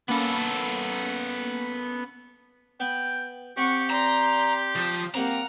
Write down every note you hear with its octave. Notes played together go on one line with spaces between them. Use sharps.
A#3 B3 C#4 A4 B5
B3 G5
C4 G4 F#5 C#6
D5 A#5 C6
F3
G3 A#3 C4 F5 F#5 A#5